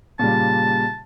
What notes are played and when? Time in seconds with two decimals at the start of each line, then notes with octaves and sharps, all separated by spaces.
0.19 A#2 C#3 G3 A5